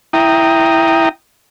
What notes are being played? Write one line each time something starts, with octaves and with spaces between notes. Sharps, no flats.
E4 G5 A#5 D#6